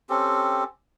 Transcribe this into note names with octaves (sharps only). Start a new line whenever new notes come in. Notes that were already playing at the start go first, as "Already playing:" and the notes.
C4 C#4 G4 A4